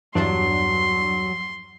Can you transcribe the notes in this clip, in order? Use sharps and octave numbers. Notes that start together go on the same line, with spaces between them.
E2 G2 F#3 D4 C6